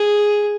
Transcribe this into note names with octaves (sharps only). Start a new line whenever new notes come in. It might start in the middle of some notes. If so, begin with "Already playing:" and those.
Already playing: G#4